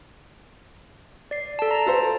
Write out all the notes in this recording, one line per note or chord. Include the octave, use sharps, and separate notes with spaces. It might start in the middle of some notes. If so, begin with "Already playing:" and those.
D5 C7
A4 A5
A#5
A4 C5